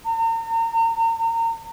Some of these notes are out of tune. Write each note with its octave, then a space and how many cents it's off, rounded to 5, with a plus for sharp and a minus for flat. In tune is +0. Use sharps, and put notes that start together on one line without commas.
A#5 -40